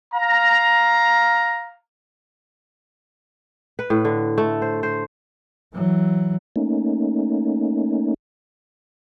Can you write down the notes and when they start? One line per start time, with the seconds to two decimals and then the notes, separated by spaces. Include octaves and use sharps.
0.14 F5 A#5
3.79 B4
3.90 A2
4.05 D3
4.38 A3
4.62 C5
4.83 C5
5.73 E3 F#3
6.56 A3 A#3 C#4 D#4